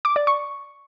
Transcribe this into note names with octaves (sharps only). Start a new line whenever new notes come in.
D6
D5
C#6